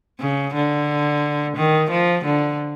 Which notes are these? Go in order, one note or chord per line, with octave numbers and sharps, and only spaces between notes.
C#3
D3
D#3
F3
D3